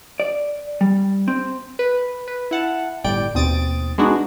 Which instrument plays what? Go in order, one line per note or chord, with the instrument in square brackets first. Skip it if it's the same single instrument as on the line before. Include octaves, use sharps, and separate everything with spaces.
[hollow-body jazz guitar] D5
G3
C4
[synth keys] B4
B4
E4 F#5 A5
G1 A2 G3 D5 G5 D7
D#2 B2 C4 D#6 A6 D7
G#3 B3 D4 D#4 F#4 G#4